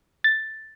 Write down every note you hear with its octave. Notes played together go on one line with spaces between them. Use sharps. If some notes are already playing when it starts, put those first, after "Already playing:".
A6